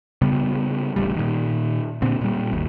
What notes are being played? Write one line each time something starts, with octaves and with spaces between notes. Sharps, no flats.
C#3 G3 B3
D1 A1 D2 G3
A#2 D#3
A#2 D3 C4
A#2 G3
G#1 D#2